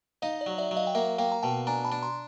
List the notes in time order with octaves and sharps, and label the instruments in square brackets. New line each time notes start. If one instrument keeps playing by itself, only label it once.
[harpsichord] D#4 [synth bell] D#5 F5
[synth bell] D5
[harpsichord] F#3
[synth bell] D5 E5
[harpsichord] F#3
[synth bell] D#5 F5
G5
[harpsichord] A#3 [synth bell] E5 F#5
[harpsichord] A#3 [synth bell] F5 G5
[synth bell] A#5
[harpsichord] B2 [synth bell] G5 A5
[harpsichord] D4 [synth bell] G#5 A#5
[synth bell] A5 B5
[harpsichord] D4
[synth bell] A#5 C6